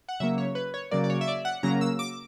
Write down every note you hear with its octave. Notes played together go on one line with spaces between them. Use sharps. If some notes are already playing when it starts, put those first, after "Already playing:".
F#5
C#3 F#3 A#3 E5
C#5
B4
C#5
C#3 F#3 A#3 D5
D5
C#5
E5
D5
F#5
C#3 F#3 A#3 A#5
E6
D6